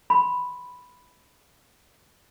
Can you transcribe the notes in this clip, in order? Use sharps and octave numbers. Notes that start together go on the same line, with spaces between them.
B5 C6